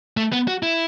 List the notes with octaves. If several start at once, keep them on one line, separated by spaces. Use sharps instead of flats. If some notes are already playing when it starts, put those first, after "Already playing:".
A3
B3
F#4
E4